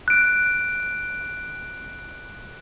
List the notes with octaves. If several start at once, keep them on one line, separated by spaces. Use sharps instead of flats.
F#6 D7